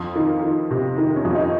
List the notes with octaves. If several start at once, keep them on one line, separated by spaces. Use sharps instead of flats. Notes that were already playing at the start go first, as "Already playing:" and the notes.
Already playing: F2 F4
D#3
D#3
C3
D#3
C#4
F2
D#4